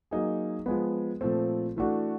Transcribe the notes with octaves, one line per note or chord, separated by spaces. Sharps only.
F#3 A#3 D#4 G#4
F3 G#3 B3
A#2 F3 A3 C4
E3 A3 D4 F#4